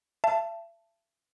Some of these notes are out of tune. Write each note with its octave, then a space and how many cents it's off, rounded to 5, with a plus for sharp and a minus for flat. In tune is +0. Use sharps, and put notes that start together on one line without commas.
E5 +40 A5 +0